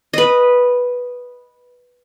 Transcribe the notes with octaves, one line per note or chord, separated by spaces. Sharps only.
B4 D#5